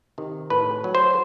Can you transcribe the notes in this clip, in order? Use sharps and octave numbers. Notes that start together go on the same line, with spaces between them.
C3 D#3
A2 B4
F#3
C5